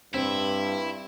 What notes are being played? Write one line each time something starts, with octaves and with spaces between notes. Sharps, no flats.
G2 C4 E4